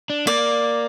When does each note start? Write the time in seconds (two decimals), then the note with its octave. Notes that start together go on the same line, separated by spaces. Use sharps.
0.10 D4
0.27 A#3 D5